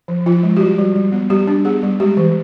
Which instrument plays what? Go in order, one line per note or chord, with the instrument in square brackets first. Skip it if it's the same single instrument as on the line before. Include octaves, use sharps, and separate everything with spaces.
[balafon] F3
F3 F4
G#3
G4
G3 F#4
G3
G3
B3
G3 G4
D4
B3 G#4
G3
G#3 G4
E3